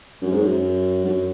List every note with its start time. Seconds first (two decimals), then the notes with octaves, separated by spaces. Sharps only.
0.22 F#2
0.31 G#2
0.42 F#2
1.05 F#2